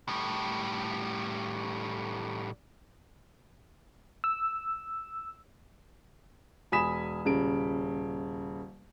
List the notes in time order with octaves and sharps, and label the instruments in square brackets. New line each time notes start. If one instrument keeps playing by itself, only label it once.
[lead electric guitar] A2 G3
[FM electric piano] E6
[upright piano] E1 G#5 B5 D#6 B6 E7
D#1 C#3 D7